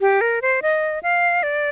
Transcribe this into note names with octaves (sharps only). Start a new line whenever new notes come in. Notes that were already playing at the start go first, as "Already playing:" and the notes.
G4
A#4
C5
D#5
F5
D5